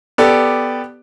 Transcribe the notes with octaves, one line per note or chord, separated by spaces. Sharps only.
B3 G4 A4 D5